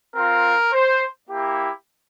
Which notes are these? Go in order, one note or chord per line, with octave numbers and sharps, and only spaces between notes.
C4 F4 A#4
C5
A#3 E4 G4